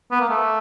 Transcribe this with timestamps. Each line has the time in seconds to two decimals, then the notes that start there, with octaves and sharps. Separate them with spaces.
0.11 B3
0.21 A#3
0.30 A3